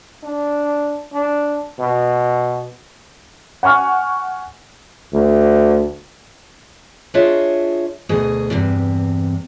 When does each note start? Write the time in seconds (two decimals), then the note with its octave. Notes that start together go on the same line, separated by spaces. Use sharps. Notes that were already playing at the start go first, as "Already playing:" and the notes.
0.24 D4
1.13 D4
1.80 B2
3.63 F#5 G#5 C#6 F6
5.13 D2
7.14 D4 F4 G#4 C#5 D#5 E5
8.09 D2 B2 G#4 D#5
8.50 E2 G2 C3